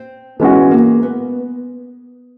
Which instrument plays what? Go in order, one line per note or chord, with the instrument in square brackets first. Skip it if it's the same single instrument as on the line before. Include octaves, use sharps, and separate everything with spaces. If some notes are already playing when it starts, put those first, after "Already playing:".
Already playing: [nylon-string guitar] C4
[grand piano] E3 G#3 C#4 F#4 [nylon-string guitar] B3
[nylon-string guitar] A#3
B3